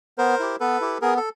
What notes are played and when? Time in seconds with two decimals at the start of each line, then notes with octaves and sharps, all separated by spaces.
0.18 B3 A#4 C5
0.40 E4 G4
0.60 B3 A4 B4
0.81 E4 G4
1.01 B3 G#4 A#4
1.17 A4